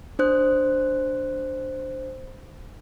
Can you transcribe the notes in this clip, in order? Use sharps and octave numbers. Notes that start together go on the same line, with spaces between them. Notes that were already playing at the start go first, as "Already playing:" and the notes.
D4 C5 F#6